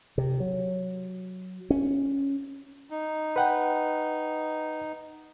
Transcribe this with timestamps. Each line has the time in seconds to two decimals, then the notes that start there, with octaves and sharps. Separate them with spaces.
0.18 C3
0.40 F#3
1.70 C#4
2.90 D#4
3.36 B4 F#5 G5